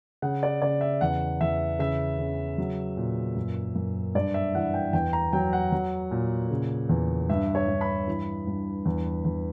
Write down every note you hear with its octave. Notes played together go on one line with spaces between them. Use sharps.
C#3 F#5
D5
C#3 D5
E5
E2 F#5
E2 E5
C#3 E5
C#3
F#3
A#2
F#2
F#2
G2 D5
E5
E3 F#5
G5
E2 G5
A#5
F#3 G5
F#5
F#3
A#2
C#3
E2
G2 E5
C#5
G2
B5
E3
G2
E2
E2